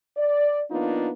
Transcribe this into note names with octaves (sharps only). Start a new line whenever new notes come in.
D5
F3 A#3 B3 D4 D#4 F4